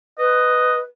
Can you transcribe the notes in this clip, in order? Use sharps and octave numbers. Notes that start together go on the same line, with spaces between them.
B4 D#5